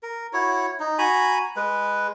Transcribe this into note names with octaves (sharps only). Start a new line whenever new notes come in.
A#4
E4 F#4 C#5
D#4
F#4 G#5 A#5 B5
G#3 B4